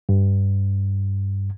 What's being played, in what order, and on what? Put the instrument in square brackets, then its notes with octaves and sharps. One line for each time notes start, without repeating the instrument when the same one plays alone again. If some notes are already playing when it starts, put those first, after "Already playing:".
[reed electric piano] G2